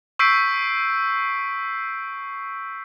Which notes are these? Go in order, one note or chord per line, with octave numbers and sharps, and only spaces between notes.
C#6 E6 G6 B6 C7 D7